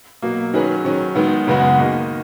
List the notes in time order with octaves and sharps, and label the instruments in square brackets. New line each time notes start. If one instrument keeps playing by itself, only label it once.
[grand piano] B2 F#3 A#3
D#3 F#3 C#4 G#4 B4
D#3 F#3 C#4
D#3 G#3 B3
F#2 C#3 G#3 B3 F#4
D#3 A#3 D#4 F#4